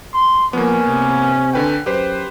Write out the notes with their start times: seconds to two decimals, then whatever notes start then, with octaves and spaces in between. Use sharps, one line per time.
0.14 C6
0.53 F3 A#3 B3 C#4
0.88 C3
1.53 D3 B4 G5
1.86 F#2 G4 B4 C5